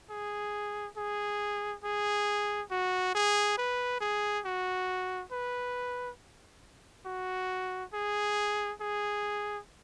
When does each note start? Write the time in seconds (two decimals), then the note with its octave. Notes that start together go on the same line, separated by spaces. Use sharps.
0.10 G#4
0.97 G#4
1.84 G#4
2.71 F#4
3.15 G#4
3.58 B4
4.01 G#4
4.46 F#4
5.32 B4
7.06 F#4
7.94 G#4
8.81 G#4